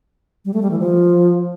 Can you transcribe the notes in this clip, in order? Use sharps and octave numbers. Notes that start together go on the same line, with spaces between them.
G3
A3
G3
E3
F3